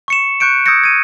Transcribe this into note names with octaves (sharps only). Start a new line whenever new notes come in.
C#6 C#7 E7
C#6 F#6 G6 C#7 D7
D#6 E6 G6 G#6 A#6 C#7
G#6 D#7